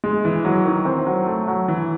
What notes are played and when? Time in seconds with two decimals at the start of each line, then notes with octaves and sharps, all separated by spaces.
0.04 G#3
0.25 E3
0.45 F#3
0.66 D#3
0.85 C4
1.07 F#3
1.26 A3
1.48 F#3
1.68 E3